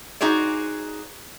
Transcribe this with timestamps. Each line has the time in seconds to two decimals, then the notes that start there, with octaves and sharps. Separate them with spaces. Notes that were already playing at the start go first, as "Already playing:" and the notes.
0.21 D#4 F#4 G#4 C5 D5